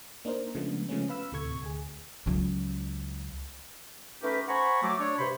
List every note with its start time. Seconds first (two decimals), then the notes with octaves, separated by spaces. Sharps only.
0.25 A#3 D4 D#4 A#4 C5
0.55 C#3 F3 G#3 A3 B3 D4
0.89 C#3 F3 G#3 A3 B3 C#4
1.09 B4 F5 B5 E6
1.32 D2 A2 C3 A4 C#6 G#6
1.62 D2 G#4
2.26 C#2 F#3
4.22 A3 C#4 D#4 G4 A#4 B4
4.48 C5 F#5 G#5 A#5 B5 C#6
4.83 F#3 A3 D6
5.00 D4 C#5
5.18 G2 C3 C5 B5 C6